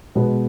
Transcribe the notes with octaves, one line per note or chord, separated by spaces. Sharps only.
B2 G#3 B3